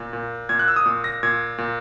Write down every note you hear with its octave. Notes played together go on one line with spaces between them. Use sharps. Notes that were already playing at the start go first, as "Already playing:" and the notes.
Already playing: A#2
A#2
A#2 G#6
F#6
E6
D#6
A#2
A#6
A#2 G#6
A#2